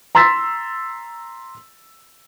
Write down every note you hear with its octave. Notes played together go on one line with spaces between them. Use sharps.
A#5 C6 E6 A6 B6